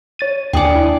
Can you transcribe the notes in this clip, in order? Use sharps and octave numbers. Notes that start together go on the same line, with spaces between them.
C#5 A6 D#7
D#2 D4 D5 G5 G#5 D#6
E4